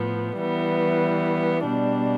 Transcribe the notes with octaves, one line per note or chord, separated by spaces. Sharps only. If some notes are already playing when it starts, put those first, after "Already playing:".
Already playing: A2 F3 B3
E3 G3 B3
B2 G3 D4